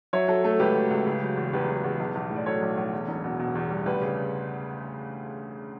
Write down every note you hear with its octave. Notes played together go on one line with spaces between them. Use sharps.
F#3 C#5 E5
F#3 A4
A3 A4
C#2 G4 B4
F#3
C#2
C#3
F#3
E2
E2 G4 B4
F#3
E2
B1
B1
A2
D5
F#3 A4 C#5
B1
B1
E2
E1
B2
B2
E2
G3
D2 G4 B4
C#3